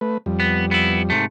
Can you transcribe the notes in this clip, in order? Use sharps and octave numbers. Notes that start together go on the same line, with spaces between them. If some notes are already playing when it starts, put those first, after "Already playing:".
A3 B4
F2 G3
B3
B3 E4
G#2 C3 A3